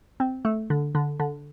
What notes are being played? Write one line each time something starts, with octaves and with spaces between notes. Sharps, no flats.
C4
A3
D3
D3
D3